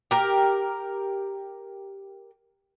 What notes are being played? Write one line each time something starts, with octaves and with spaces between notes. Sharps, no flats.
G4 A#4